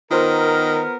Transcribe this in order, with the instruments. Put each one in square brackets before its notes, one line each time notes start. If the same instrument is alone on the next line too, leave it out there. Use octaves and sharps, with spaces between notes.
[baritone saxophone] D#3 [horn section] B3 A#4 [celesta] F4 C5 C6